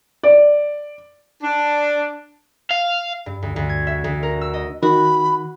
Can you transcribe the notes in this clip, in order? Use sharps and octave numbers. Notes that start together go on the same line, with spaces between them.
D5
D4
F5
G2
D2
D2
G#6
E5
D2
A#4
E6
D#5
D#3 F#4 B5